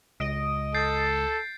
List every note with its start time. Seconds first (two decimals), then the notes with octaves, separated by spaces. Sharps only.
0.20 C#2 D#5 D7
0.74 A4 G6 A6 C7